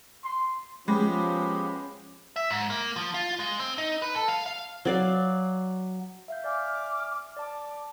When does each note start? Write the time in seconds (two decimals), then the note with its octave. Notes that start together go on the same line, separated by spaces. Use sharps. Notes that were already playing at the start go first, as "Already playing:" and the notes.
0.24 C6
0.88 F3 G#3 B3 C#4 G4 B5
2.36 E5
2.51 G#2
2.70 A#3
2.96 F3
3.14 F4
3.39 G#3
3.60 C4
3.78 D#4
4.02 B4
4.16 A4
4.28 F5
4.46 F5
4.85 F#3 D5 F5
6.28 E5 F5 G6
6.44 D5 E5 G#5 D6 F6
7.37 D5 A5 D6